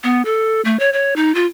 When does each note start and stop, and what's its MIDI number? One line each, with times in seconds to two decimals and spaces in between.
0.04 0.22 59
0.25 0.61 69
0.65 0.77 57
0.79 0.92 73
0.93 1.14 73
1.16 1.34 63
1.35 1.45 65